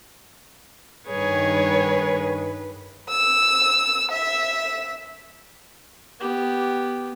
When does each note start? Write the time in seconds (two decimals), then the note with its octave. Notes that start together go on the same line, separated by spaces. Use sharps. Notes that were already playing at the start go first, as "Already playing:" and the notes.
1.08 G2 D#3 G#4 B4 C#5
3.10 E6
4.11 E5
6.20 B3 G4